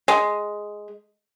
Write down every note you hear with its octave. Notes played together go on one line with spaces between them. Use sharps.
G#3